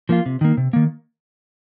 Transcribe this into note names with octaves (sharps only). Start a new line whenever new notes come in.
F3 A#3 F4
C3
D#3 A#3
C3
D#3 A#3